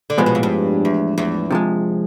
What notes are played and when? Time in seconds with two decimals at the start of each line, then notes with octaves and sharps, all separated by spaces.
0.10 D3
0.18 A2 C3 F3 G#3 B3
0.26 B2
0.35 A#2
0.43 G2
0.85 E2
1.18 E2
1.50 C3 F3 G#3